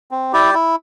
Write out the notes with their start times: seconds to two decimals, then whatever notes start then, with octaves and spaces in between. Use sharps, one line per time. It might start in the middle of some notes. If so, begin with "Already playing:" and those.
0.11 C4
0.33 E4 G4 D5 G5
0.54 E4